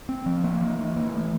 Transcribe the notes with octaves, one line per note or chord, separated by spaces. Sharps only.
C4
F3
A#3
E3
A#3
E3
A3